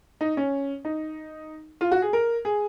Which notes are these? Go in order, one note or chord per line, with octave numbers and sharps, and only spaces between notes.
D#4
C#4
D#4
F4
F#4
G#4
A#4
G#4